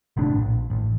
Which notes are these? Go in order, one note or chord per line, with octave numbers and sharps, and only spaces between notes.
G1 A2 C3 D4
A#1
A1